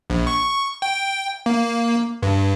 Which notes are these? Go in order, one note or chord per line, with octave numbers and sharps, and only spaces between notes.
A#1
C#6
G5
A#3
G2